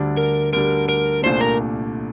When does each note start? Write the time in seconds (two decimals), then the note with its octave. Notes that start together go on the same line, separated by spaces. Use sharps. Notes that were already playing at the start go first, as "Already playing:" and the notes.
Already playing: D2 D3 G3 D4
0.17 A#4
0.53 D2 D3 G3 D4 A#4
0.89 A#4
1.23 C2 A#2 A3 D4 C5
1.41 A#4